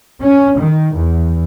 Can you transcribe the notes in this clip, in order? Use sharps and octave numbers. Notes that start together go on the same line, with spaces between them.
C#4
D#3
E2